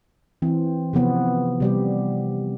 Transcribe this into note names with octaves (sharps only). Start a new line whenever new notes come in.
E3 C4
C3 F3 B3
C3 G3 G4